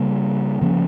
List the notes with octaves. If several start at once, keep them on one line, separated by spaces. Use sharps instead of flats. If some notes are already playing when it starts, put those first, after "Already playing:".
Already playing: C#3 G3 A#3
C#3 F3 A#3 C#4